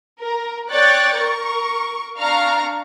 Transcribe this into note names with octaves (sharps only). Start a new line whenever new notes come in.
A#4
C#5 D5 G5 F#6 A6
A#4 C#6
D4 F5 A#5 C#6 F6